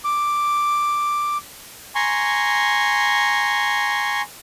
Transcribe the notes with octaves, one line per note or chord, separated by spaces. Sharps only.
D6
G#5 A#5 C6 C#6